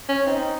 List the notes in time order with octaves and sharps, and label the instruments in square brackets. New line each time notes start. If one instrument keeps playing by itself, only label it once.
[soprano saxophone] C#4
[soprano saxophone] C4 [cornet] D#4